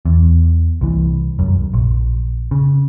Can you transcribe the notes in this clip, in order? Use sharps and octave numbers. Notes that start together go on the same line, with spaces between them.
E2
C2 E3
C2 F#2
A#1
C#3